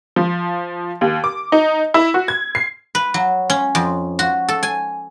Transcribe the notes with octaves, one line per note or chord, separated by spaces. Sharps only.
F3
D#2
D6
D#4
E4
F#4
G#6
C7
B4
F#3
C#4
F2
F#4
A4
G#5